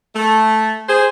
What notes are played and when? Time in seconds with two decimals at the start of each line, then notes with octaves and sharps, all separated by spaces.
0.15 A3
0.89 G#4 C5